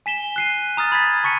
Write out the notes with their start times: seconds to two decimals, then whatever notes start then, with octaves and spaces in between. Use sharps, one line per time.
0.06 G#5 B6 E7 G7
0.36 F#6 C7 D#7
0.77 A#5 D#6 F6 A6
0.92 B5 G#6 A6 B6
1.24 A5 C#6 B6 C#7 D#7